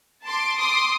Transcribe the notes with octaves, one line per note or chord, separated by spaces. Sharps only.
A5 C6 D6
C6 D6 D#6